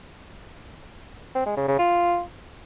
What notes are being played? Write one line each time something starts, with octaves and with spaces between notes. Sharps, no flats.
C4
G#3
C#3
C#3
F4